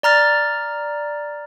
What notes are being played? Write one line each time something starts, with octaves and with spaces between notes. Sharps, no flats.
D5 A#5 F6 A6